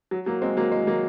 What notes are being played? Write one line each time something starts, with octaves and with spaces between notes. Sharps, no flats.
F#3
F#3 A#3
G#3 C4
F#3 A#3
G#3
F#3 A#3